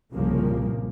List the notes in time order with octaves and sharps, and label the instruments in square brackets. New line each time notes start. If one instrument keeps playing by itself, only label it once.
[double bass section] C2 G2 A#2 C#3 F3 A#3